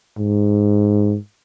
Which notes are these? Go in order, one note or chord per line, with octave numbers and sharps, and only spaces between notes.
G#2